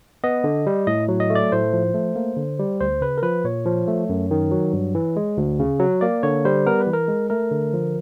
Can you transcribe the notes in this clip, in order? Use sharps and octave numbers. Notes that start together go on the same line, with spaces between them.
B3 D#5
D3
G3
A2 D#5
F#3
D#5
A3
D5
A2 C5
F3
A3
A#3
D3
G3
D2 C5
C#3 B4
A#4
F3 B4
A#2 C#5
F3
A3
F#2
D#3
F#3
G2
E3
G#3
D2
C#3
F#3
A#3 D5
D3 C#5
G3 C5
B3 A#4
B4
E3
A#4
G#3
A3 A#4
D3
F3